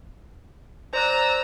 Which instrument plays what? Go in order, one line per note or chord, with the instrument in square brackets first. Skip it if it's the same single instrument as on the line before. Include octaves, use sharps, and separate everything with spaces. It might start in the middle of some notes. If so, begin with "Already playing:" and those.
[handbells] C5 D5 F#6 [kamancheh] A#5 E6